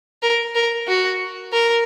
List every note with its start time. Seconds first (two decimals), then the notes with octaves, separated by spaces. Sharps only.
0.22 A#4
0.55 A#4
0.87 F#4
1.53 A#4